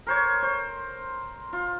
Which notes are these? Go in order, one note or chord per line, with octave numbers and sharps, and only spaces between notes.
A#4 C5 C#5
C5
F4